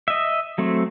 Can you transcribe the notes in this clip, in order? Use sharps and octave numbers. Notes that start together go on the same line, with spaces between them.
D#5 E5
F#3 A3 C4